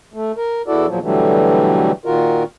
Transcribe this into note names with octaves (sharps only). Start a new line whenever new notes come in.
A3
A#4
E2 E4 F#4 A4 D5
E2 A#2 F3 F#3
B2 D3 E3 F#3 G3 A3
A#2 D#3 F4 F#4 A#4